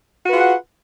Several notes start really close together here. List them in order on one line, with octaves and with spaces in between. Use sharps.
F#4 B4 F4 G#4 F#5